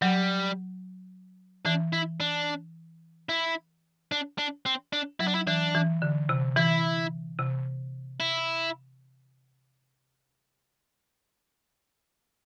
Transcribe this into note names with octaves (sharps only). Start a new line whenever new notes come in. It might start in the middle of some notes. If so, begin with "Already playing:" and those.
F#3 G3
E3 D4
E4
D4
E4
D4
D4
C4
D4
F#3 E4
D4
E4
E3 D4
E3
D3
C3
E3 E4
C3
E4